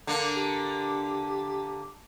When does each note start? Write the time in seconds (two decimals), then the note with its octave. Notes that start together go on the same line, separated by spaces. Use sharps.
0.07 D3 A#3
0.36 G4